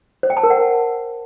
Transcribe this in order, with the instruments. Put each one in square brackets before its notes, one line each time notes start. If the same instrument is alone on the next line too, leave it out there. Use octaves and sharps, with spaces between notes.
[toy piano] C5
G5
A5
A#4
F#5